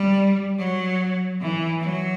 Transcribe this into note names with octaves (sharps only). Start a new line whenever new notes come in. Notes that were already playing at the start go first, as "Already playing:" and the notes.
Already playing: G3
F#3
E3
F#3